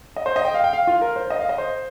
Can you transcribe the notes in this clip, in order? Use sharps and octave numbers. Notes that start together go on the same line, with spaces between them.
D#5
C5
D#5
G5
F5
G5
F5
F4
A#4
C5
D#5
F5
D#5
C5